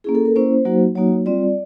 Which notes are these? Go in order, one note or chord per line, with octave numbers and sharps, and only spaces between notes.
A#3 C#4 E4 G#4
A4
A#4
A#3 C#4 E4 C5
F#3 A#3 D#4 F#4
F#3 A#3 D#4 F#4 C#5
G3 C4 F4 D5